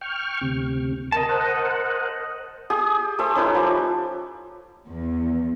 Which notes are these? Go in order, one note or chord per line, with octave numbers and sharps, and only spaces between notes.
G5 C#6 F6
D2 C3
A#4 D#5 A5
A#4 C5 F#5
G4 G#4 D#6
A3 G4 C5 E5
C#4 D#4 E4 B4
F3 D6
E2